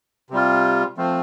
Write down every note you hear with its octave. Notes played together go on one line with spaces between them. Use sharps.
C3 G3 F4
F3 A3 C4